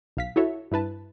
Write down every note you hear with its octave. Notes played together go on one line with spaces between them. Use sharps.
B1 F5 B6
E4 F#4 A4 C#5 E5
G2 E4 B4 A5